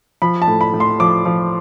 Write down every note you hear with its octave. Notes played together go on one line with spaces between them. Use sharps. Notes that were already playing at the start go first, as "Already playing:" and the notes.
F3 B5
A5
A2
B5
A2
C6
F3 D6
F3